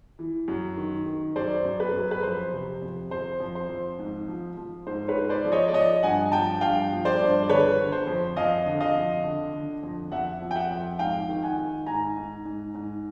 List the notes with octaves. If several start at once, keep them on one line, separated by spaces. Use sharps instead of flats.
E3
F#2
D#3
D#3
F#2 C5 D5
F#2
B4
F#2
B4
F2 C5
C3
F2
F2 C5
F2
C5
F2
G#2
F3
F3
G#2 C5
B4 C#5
G#2
C5 D5
F3
C#5 D#5
D5
F3 C#5 D#5
G2 F#5 G#5
F3 G5 A5
G2 F5 G5
F3
C5 D5
G2
D5
D3 B4 C#5
D3
C5
F2
F2 D#5 F5
D3
D#5 F5
F2
D3
D3
F2
F2 E5 F#5
F3
G5
E5 F#5
F2
G#2 F5 G5
D#3
F#5 G#5
D#3
G#2 G#5 A#5
G#2
G#2
G#2